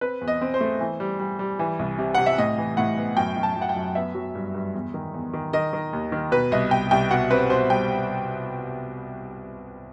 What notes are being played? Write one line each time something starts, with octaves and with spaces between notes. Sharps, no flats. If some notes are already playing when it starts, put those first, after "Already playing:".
C4 B4
E2
D#5
C4
C5
A3
E3
G3
G3
G3
E3
C2
C3
C3 F#5
E5
A2 D#5
E3
A2 F#5
B3
F#2 G5
F#2
A5
F#2
F#5
G5
F#2
B3 E5
F#3
G2
G2
E2
D#3
E2
D#3
D#3 D#5
D#3
D#2
D#3
B2 B4
C2 D#5
C2 G5
C2 G5
B2 F#5
C4 B4
B2 C5
G3 G5